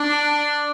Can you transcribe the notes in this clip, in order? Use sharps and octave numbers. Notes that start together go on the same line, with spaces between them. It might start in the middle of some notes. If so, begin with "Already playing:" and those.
Already playing: D4